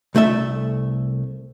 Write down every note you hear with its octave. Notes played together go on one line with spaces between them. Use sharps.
C2 A3 A4 E5